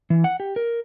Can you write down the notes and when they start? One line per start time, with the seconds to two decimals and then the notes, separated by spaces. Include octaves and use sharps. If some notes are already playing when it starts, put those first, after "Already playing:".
0.10 E3
0.24 F#5
0.40 G4
0.56 A#4